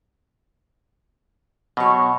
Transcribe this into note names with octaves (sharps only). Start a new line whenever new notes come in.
B2 F#3 C#5